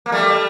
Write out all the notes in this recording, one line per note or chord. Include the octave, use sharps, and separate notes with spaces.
A#3
G3 A3